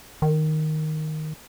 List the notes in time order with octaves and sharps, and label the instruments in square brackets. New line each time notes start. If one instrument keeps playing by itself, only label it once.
[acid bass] D#3